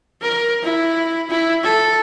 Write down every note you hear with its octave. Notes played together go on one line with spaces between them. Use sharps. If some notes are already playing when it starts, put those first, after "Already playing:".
A#4
E4
E4
A4